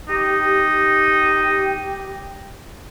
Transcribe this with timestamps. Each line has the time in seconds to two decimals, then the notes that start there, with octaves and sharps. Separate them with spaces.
0.09 D#4 G4